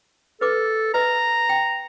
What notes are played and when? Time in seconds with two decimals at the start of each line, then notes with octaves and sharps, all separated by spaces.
0.41 A4 B4 D6
0.94 B4 D#5 A#5
1.49 G5